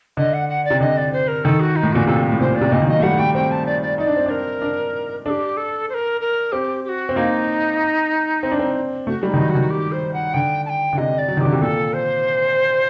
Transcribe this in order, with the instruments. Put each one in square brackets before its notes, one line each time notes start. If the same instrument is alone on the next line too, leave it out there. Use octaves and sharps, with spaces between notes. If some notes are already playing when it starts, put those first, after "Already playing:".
[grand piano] D3 [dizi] D#5
[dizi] F#5
F#5
D5
[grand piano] C3
[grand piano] D3 [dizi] D#5
[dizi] D5
C5
A#4
[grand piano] D#3 [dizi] A4
[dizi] F#4
D#4
[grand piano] A2
[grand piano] A#2 [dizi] F#4
[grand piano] C3 [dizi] A4
[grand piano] A2
[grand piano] A#2 [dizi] C5
[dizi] D5
[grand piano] C3
[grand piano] A#2 [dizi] D#5
[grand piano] D#3
[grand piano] F#3 [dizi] D#5
[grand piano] A3
[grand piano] G3 [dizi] F#5
[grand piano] A3 [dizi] G5
[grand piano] C4 [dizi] G5
[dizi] A5
D5
D5
[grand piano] D#4 [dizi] D5
[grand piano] D4
C4
[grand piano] D4 [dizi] A#4
[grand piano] D4
[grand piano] D4 [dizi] G4 A4
[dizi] A4
C5
A#4
A#4
[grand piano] C4 [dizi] G4
[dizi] G4
F#4
[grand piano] C4
[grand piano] A#3 [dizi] D#4
[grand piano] C4
D4
C4
[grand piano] A3 [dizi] F#4
[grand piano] G3
[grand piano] D#3 [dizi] D#4
[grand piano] F#3
[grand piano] D#3 [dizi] F#4
[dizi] G4
C5
F#5
[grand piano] D3 [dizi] G5
[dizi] A5
G5
[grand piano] D3
[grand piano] C3 [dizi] D#5
[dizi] D5
[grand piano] F#3
D#3
[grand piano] D3 [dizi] G4
[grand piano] C3
[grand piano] A#2 [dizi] A4
[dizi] C5